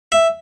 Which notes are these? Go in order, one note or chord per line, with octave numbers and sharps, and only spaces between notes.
E5